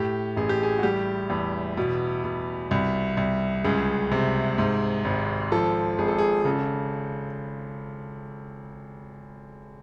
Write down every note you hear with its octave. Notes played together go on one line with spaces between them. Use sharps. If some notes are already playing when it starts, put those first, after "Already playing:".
Already playing: A2 G4
A1 G#4
G4
G#4
F#4
G3 G4
E2
B2
B2
C2
C2
C#2 G#4
C3
G#2
G#1
F3 A4
G#1 G#4
A4
G#4
C#3 A4